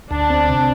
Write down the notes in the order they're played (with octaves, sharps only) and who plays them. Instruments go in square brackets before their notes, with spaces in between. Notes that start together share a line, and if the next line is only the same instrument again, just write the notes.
[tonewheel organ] D2 [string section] D4
[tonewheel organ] C4
C3